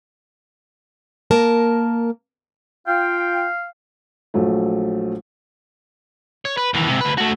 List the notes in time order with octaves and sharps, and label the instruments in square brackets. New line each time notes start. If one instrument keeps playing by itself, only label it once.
[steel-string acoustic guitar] A#3 A#4 A5
[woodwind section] F4 G5 [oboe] F5
[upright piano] A#1 F#3 A3
[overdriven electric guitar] C#5
B4
D#2 E3
G#2 C3
D2 B4
A3 F#4